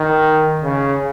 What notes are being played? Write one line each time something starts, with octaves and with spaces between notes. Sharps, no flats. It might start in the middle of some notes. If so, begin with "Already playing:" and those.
Already playing: D#3
C#3